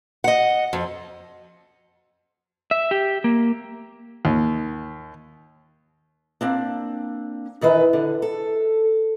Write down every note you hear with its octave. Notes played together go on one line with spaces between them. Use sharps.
D#5 F#5
F2
E5
G4
A#3
D#2
A#3 C4 D4
F#2 D#3 E3 B4
D3
A4